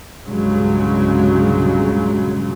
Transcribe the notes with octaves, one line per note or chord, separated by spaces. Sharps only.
C2 G2 A#2 C#3 F#3 G#3